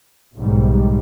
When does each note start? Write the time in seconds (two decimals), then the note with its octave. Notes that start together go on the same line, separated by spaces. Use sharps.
0.37 B1 G#2 D#3 G3